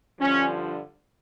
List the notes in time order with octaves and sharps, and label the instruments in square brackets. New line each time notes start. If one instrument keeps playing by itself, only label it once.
[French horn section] G2 D3 F3 C#4